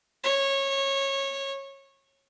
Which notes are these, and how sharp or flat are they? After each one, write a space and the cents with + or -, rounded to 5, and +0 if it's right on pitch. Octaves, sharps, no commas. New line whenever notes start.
C#5 -20